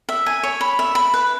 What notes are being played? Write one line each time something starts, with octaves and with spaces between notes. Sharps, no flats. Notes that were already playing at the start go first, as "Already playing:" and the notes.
E5
G#5
C#5
B5
E5
B5
B4